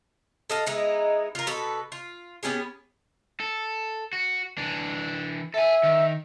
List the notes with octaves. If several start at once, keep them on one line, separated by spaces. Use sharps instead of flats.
A4 D#5 F5
G#3 B3 D#4 E4
F4 A#4
B2 A4 B4
F4
B3 C#4 G4 G#4
A4
F#4
E3 D4
A4 E5 G#5
D#3